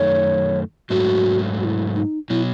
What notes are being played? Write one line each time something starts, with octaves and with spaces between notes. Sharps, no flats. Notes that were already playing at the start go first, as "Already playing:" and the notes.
Already playing: F#2 D#3 A3 C#5
G#2 F#3 A3 F#4
F#4
E4
D#4
B2 F#3 E4